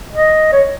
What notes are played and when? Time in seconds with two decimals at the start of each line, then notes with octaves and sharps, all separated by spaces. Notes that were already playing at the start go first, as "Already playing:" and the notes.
0.13 D#5
0.52 C#5